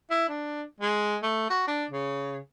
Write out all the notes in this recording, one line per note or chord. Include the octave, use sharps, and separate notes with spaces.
E4
D4
G#3
A3
F#4
D4
C#3